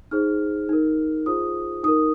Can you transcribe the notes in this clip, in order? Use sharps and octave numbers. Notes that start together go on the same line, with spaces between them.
D#4 G#4 C5 F6
D#4 A#4
F4 G#4 C5 D#6
D#4 A#4 D#6